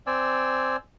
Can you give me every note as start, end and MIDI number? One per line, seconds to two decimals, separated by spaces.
0.07 0.77 60
0.07 0.77 74
0.07 0.77 80
0.07 0.77 88